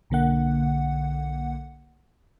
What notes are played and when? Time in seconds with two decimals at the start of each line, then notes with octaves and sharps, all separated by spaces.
0.10 B1 D3 A#3 F#5